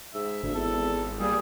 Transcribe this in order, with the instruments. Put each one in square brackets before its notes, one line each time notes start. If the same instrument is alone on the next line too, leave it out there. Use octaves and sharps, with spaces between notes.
[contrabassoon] G#2 [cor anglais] E5
[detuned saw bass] G#1 [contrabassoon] D2
[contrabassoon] E2 [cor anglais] A4
[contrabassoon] A#2 [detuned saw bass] G3 [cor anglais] G#4